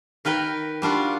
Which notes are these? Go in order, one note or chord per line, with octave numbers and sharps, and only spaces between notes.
D#3 A#4 B4 G5
G3 D4 F4 F#4